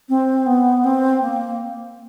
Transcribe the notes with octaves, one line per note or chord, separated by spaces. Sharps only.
C4
B3
C4
A#3